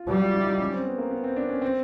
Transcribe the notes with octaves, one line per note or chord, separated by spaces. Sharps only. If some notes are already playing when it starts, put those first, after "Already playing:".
Already playing: F4
G3 F#4
F4
E4
D#4
C#4
C4
B3
A#3
B3
C4
D4
C#4
C4